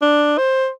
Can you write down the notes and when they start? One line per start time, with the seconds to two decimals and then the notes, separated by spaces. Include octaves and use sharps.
0.02 D4
0.38 C5